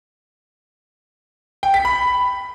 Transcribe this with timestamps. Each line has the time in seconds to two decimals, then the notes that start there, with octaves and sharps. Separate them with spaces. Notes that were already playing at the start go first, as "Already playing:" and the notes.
1.63 G5
1.74 B6
1.85 B5